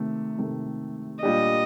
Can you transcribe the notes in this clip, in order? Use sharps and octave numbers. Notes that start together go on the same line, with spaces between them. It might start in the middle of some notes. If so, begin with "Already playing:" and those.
Already playing: C3 D#3 A3
C3 D#3 A3
A#2 G3 D4 G4 D#5